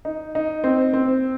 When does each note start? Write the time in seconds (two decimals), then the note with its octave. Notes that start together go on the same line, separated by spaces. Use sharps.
0.05 D#4
0.35 D#4
0.64 C4
0.93 C4